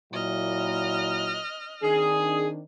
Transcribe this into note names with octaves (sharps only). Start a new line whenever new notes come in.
A#2 F#3 E4 D#5 F6
D#3 C4 D4 G#4